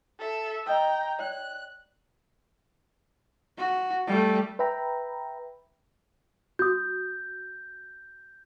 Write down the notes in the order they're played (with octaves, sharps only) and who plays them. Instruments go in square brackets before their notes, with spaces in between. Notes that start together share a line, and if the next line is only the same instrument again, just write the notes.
[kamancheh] A4 E5
[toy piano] D#5 D#6 E6 [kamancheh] G5 A#5
[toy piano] C#5 D5 G5 [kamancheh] F#6
[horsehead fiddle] F#4
G3 A3
[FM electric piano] B4 E5 G5 A#5 B5
[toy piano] F#4 D#6 [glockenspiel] G6